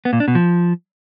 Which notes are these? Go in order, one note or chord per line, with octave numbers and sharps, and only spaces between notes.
B3
A#2
D4
B2
F3